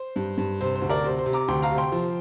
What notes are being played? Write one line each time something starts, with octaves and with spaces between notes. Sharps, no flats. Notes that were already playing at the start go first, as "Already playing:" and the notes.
Already playing: C5
G2
G2
C3 C5
C5
D2
A#4 D5
C3 C5
C5
C3
A#5 D6
D2 G5 C6
F5 A#5
C3
G5 C6
F3